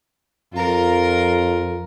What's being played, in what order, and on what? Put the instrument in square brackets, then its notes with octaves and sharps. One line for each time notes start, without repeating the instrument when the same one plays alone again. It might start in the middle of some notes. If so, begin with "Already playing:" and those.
[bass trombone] F2 [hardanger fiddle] F4 A#4